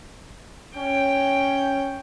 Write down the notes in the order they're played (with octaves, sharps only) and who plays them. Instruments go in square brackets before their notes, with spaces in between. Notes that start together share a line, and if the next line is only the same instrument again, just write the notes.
[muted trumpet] C#4 [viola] C#5 G5